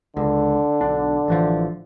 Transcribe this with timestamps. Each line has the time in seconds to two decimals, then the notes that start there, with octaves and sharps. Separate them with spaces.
0.17 C#2 D3
0.81 B1 D4
1.28 A1 E3 F3